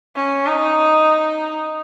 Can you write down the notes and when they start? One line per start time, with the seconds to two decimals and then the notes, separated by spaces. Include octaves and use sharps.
0.16 C#4
0.46 D#4